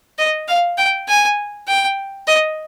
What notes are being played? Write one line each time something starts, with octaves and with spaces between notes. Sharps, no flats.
D#5
F5
G5
G#5
G5
D#5